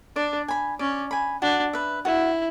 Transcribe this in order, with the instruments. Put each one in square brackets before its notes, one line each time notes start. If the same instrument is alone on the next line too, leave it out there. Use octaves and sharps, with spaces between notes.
[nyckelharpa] D4 [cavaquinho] D5
[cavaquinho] G#5 B5
[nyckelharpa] C#4 [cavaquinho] D5
[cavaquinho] G#5 B5
[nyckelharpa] D4 [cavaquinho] F#4
[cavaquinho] B4 E5
[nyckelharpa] E4 [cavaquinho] F#4